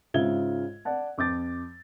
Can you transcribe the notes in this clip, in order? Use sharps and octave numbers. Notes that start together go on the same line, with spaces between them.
G#2 C#3 F4 E5 G#6 G7
D5 F#5 A5
F2 D6 G6 A6